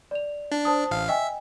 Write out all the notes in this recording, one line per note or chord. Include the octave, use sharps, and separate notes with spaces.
D5 F7
D4
C5 A5 D#6
A1 F5
D#5 E5 G5 G#5